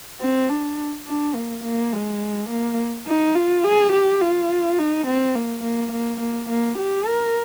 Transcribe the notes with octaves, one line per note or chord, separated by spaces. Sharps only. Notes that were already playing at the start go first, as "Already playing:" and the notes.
C4
D4
D4
A#3
A#3
G#3
A#3
D#4
F4
G#4
G4
F4
D#4
C4
A#3
A#3
A#3
A#3
A#3
G4
A#4